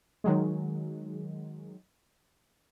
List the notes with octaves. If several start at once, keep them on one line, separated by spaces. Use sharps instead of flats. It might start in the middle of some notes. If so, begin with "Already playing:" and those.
D#3 F#3 G#3